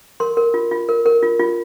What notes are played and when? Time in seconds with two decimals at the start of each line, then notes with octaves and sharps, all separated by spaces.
0.20 A#4 C6
0.37 A#4
0.54 F4
0.71 F4
0.89 A#4
1.06 A#4
1.23 F4
1.40 F4